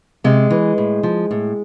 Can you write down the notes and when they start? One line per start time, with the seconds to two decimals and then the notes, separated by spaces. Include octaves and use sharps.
0.24 C3 G#3
0.51 E3
0.78 A2
1.03 F3
1.31 A2